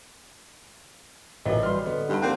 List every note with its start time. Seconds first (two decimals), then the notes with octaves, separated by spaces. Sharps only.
1.45 A1 A#2 E3 F#4 C#5 D#5
1.63 E3 G3 C6 F6
1.86 D3 B3
2.09 G2 D#4 F#5
2.22 F3 A#3 C4 A#4 F#6